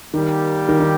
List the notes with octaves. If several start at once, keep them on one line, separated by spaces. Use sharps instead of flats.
D#3 G3 A#3 G4
D#3
D#3